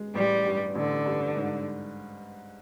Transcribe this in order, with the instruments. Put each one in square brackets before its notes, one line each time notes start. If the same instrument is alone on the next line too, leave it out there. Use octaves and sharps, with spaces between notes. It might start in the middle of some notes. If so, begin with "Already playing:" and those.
Already playing: [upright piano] G#3
[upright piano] A1 [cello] G3
[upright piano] G2
[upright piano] A1 [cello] D3
[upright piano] G2
G#2